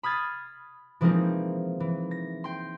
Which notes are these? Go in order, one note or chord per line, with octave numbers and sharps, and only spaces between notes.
B5 D#6 F6 G#6 A6 C7
E3 F3 G#3 A#3 C4 D#4
E3
A#6
G5 C6